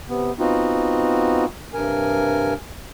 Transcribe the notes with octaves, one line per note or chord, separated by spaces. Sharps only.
C3 B3
B3 C4 D#4 F4 F#4
G2 C3 A#4 G#5